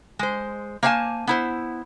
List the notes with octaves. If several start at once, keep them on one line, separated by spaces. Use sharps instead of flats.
G#3 C5
A#3 C5 C#5 F5 G#5 A5
B3 E4 C5